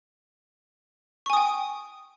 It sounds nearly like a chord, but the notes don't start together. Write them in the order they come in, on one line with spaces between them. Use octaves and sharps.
C#6 G#5 D#6 G5